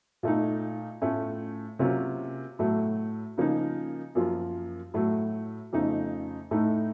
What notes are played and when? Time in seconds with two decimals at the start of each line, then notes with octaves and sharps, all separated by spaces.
0.23 A#2 A3 D#4
1.02 A2 A3 C#4 F4
1.79 C3 F#3 A#3 C#4 F4
2.59 A2 F#3 A3
3.38 C#3 F3 A#3 D#4
4.15 F#2 F3 A#3 F4
4.94 A2 F#3 A3
5.73 F2 C#3 A3 D#4
6.51 A2 A3 D#4